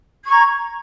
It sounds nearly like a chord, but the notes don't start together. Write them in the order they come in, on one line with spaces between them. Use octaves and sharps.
G#6 C#6 A#5